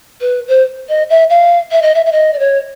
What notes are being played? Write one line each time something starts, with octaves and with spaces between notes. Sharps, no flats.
B4
C5
D#5
E5
F5
E5
D#5
E5
E5
D#5
D5
C#5